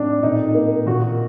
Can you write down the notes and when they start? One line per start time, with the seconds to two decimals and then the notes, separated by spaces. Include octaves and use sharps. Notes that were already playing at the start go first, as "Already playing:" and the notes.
Already playing: A2 C4 D4 D#4
0.23 A#2 D#4
0.55 A#3
0.86 A#2 F#4